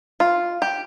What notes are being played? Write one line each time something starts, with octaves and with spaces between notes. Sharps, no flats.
F4
G4